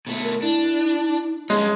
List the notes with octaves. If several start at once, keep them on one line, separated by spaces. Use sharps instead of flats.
B2 A3
A#4
D4 E4
G2 G#3 C#4